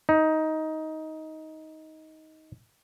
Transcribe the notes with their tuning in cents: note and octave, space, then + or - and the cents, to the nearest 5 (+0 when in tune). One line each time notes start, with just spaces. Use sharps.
D#4 +15